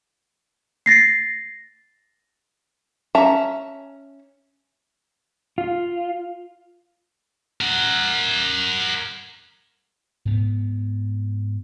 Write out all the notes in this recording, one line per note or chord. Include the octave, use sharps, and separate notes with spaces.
A6 A#6 C7
C#4 E5 A5 A#5
F4
A#4 F#5
G#2 B3